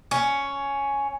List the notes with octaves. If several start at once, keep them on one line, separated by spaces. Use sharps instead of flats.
C#4